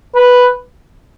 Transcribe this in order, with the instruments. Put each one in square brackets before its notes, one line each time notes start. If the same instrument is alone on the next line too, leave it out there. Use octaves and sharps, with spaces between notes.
[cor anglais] B4